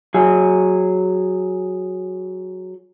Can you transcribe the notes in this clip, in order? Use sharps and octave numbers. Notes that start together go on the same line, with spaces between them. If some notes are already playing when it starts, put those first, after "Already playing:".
F#3 G#4